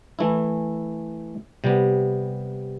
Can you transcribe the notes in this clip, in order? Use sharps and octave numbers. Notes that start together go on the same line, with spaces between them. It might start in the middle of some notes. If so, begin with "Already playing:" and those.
E3 A3 E4
C3 G3 B3